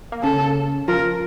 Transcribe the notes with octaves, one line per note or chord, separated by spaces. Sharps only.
A#3
C#3 C#4 A4
F3 F4 A#4